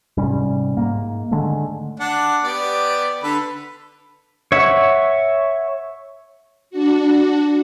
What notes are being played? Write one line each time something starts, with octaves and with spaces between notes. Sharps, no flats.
G#2 C3 G3 C#4
G#2 A#3
D3 D#3 G#3 A3
D4 F#5
B3 G4 D5
D3 A4 B4
C#5 E5 F#5 C#6
D4 F#4